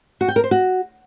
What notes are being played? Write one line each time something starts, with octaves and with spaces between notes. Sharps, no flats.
F#4
G5
A#4
C5
F#4